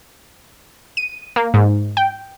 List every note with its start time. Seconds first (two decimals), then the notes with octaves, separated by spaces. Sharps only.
0.97 D#7
1.36 A#3
1.54 G#2
1.97 G5